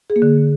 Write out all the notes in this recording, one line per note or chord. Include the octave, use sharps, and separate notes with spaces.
G#4
A#3
D3